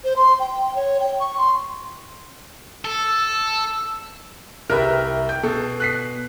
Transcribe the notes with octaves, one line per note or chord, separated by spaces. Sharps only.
C5
C6
G5
C#5
G5
C#6
C6
A4 E6
C2 G4 A#4 B4 E5
G5 G6
B2 A4
F#6 B6 C7